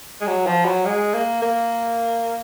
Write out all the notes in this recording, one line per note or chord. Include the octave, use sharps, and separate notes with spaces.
G#3
F#3
F3
F#3
G#3
A#3
A#3